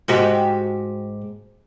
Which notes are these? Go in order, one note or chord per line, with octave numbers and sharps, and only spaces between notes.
G#2 F#4 G4